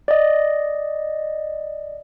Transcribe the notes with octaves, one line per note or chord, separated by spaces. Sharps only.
D5 D#5